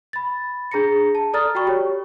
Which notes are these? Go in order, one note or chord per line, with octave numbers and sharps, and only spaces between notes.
B5 A6
D4 G#4 A#5 A#6 C#7
A5
A4 D5 A#5 D#6 F6 A6
F#4 G5 B5 C#6
G4 C#5